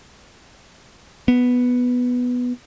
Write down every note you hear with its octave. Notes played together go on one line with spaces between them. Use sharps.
B3